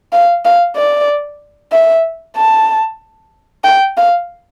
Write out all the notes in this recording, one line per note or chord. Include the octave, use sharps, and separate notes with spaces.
F5
F5
D5
E5
A5
G5
F5